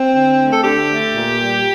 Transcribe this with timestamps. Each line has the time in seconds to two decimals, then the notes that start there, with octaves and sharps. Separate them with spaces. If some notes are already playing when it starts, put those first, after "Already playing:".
Already playing: C4
0.13 D3
0.38 A3
0.52 A4
0.63 D3 G4
0.88 A3
1.13 A#2
1.39 G3